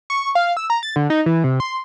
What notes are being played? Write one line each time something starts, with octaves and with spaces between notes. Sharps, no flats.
C#6
F5
E6
A#5
A6
D3
D#4
E3
C3
C6